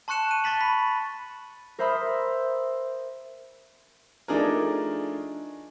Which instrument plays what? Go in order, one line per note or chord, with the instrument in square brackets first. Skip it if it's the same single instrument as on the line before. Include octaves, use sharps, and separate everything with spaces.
[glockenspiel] A5 C6 C#6 F#6 C#7 E7
D#7
A5 C#6 A6 B6 F#7
B5 B6
[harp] A#4 C5 E5 B5 C6 D#6
[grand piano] F3 A3 D4 D#4 G#4 A#4